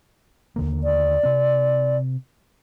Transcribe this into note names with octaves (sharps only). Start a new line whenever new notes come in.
D#2 D3 A#3
D5
C3 C4